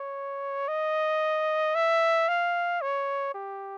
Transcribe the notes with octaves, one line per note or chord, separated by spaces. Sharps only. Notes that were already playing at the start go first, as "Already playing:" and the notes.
Already playing: C#5
D#5
E5
F5
C#5
G4